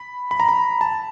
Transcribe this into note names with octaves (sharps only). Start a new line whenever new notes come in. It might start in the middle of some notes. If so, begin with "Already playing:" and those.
Already playing: B5
B5
A#5
B5
A5